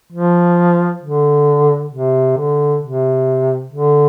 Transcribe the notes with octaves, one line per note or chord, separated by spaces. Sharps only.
F3
D3
C3
D3
C3
D3